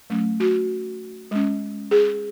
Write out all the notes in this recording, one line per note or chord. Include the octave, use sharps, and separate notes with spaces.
F#3 A3 C#4
F#4
G#3 C#4
G#4